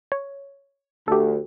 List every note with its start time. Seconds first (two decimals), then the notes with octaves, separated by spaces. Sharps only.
0.12 C#5
1.08 D2 G4 A4